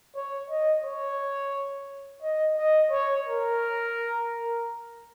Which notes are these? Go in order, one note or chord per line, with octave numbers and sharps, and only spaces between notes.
C#5
D#5
C#5
D#5
D#5
C#5
A#4